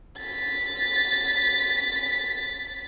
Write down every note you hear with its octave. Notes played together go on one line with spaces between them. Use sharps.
A6 B6